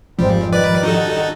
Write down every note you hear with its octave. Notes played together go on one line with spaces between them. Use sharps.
G#1 F2 G#2 F3 G3 C4
D#3 G3 B4 D5 D6
D#4 F#4 A4